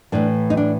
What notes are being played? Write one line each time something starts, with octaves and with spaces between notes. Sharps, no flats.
A2 E3 D4
D#4
D4